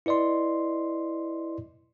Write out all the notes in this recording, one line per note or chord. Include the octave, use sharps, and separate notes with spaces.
E4 B4 D5 D#5 C6